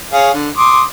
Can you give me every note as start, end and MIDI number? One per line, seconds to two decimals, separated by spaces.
0.13 0.31 68
0.13 0.31 73
0.13 0.31 77
0.34 0.49 50
0.58 0.83 84
0.58 0.83 86
0.58 0.83 87